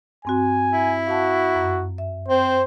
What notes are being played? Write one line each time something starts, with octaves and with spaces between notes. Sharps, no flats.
G2 C4 F#4 G#5
E4
F#4 F5 F#5 A5
F#2
E5
C4 C5